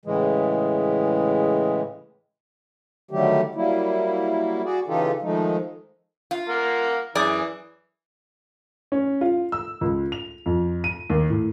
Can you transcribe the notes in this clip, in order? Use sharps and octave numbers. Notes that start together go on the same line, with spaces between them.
A2 C#3 E3 G#3
D3 D#3 F#3 G3 A3 G4
F#3 G3 A#3 E4
F#4 G#4 D5
C#3 E3 D#4 F4 G4 A4
D#3 F3 G#3 A3 D#4
F4
A#3 A#4 F#5
F#2 E3 G#4 D5
C#4
F4
E6
C#2
F7
F2
D#7
D#2
A2